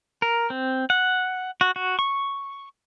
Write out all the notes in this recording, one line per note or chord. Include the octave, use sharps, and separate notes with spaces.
A#4
C4
F#5
F#4
F#4
C#6